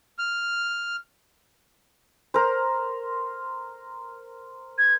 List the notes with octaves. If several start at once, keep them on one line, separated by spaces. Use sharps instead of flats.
F6
A#4 C5
G#6